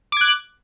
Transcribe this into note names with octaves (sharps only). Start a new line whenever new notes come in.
D6 F#6 G#6